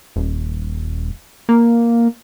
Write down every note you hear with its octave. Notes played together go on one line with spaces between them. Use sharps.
D#1
A#3